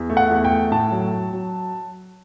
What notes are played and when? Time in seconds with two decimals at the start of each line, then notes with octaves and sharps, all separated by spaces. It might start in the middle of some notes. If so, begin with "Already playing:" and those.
Already playing: E2
0.10 A3
0.17 F#5
0.30 E2
0.45 G5
0.50 A3
0.71 A2 A5
0.91 F#3
1.13 F#3
1.33 F#3